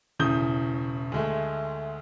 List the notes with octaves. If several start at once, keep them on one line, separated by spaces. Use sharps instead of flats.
E1 A2 C#3 D#6 G6 G7
D2 G#3 A3